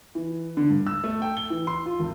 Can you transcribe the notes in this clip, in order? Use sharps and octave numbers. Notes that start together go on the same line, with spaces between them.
E3
D3
G2
E6
A3
G5
G7
E3
C6
F4
G#1